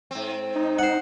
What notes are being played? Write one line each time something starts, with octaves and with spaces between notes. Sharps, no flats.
G#2 C4
D#4
C5 F#5